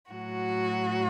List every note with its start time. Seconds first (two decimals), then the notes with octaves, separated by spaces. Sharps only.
0.12 A2 F#3 F#4